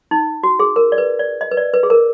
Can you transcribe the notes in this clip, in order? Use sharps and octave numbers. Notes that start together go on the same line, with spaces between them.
D#4
F#4
G#4
A#4
D5
B4
D5
D#5
B4
D5
B4
G#4
A#4